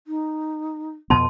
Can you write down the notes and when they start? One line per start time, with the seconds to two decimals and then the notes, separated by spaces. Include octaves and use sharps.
0.07 D#4
1.10 F2 B2 B3 A5 C6